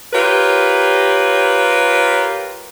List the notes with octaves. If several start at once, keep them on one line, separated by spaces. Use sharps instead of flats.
F4 G4 A#4 B4 C#5